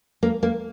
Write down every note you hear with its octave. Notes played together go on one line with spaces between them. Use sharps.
A#3
A#3